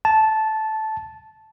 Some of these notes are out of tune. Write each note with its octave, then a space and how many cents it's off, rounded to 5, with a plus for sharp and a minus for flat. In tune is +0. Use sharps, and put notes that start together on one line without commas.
A5 -10